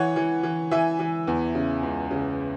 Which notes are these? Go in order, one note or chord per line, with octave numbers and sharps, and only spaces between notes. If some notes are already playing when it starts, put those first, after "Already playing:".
Already playing: E3 C#5 F#5
E3
E3
E3 E5 G#5
E3
E2
C#3
C#2
C#3